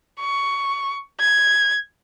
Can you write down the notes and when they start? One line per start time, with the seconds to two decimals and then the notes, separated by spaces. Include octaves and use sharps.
0.19 C#6
1.20 G#6